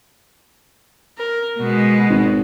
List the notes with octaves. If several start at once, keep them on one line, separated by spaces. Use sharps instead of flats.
A#4
B2 G#3 F#4
G#1